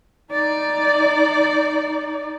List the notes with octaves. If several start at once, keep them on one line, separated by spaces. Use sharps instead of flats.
D#4 D5